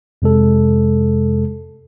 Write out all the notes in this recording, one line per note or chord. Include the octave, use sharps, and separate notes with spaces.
F2 C3 G#3 A4